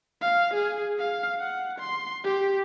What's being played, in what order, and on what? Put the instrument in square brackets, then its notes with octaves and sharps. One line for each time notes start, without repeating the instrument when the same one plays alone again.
[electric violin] F5
G#4
F5
F#5
C6
G4